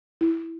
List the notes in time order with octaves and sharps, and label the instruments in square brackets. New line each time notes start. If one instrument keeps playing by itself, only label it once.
[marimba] E4